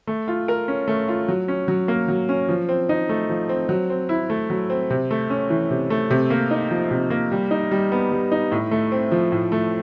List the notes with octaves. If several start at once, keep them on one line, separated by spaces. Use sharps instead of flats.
A3
F4
A#4
C#4
A3
F4
F#3
C#4
F#3
A#3
F#3
C#4
F3
C4
D#4
A3
F3
C4
F#3
C4
E4
A3
F#3
C4
C3
A3
C#4
E3
C3
A3
C3
A#3
D#4
F3
C3
A#3
G3
D#4
G3
B3
G3
D#4
A2
A3
C4
F3
A2
A3